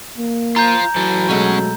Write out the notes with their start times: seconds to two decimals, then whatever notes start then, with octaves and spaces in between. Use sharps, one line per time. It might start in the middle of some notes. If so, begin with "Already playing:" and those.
0.18 A#3
0.56 F4 C5 A#5 G6
0.96 E3 F#3 A4
1.29 B2 G#3 A3 C#4 F#5